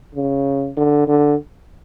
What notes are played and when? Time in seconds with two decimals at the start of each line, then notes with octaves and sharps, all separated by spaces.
0.15 C#3
0.77 D3
1.07 D3